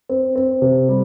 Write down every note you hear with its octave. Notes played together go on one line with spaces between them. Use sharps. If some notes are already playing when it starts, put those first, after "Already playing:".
C4
C4
C3
G3